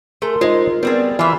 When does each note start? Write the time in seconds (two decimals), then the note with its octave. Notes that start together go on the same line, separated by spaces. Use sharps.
0.22 A3 G#4 A#4 C6
0.41 G#3 D#4 F4 C5
0.83 G3 B3 C4 G#4 D5
1.19 E3 F4 E5 B5